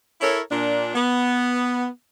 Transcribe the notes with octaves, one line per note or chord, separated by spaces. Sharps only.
E4 A4 A#4 C#5
A#2 D4
B3